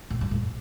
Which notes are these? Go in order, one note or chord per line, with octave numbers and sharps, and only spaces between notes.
A2
G2
A2